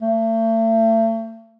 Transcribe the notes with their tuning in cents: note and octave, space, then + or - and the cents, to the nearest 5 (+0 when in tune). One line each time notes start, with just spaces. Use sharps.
A3 +40